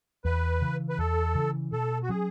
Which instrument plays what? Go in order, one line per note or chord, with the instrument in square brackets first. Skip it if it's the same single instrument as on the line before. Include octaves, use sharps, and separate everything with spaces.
[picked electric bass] E2 [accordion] B4
[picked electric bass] C#3 E3
[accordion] B4
[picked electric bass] E2 [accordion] A4
[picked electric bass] C#3 E3
[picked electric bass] B2 [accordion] A4
[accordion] F#4
[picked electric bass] F#3 C#4 [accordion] G#4